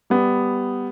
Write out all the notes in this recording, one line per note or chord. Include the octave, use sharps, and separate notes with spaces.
G3 B3